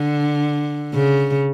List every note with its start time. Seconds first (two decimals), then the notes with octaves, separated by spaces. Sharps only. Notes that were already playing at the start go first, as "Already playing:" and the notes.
Already playing: D3
0.94 C#3